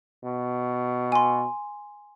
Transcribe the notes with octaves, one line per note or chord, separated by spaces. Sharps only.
B2
G#5 C6